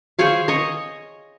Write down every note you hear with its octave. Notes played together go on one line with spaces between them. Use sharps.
G#4 C5 C#5 F5
C#5 D#5